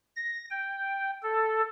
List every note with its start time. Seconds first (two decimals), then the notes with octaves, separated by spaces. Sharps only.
0.16 A#6
0.50 G5
1.23 A4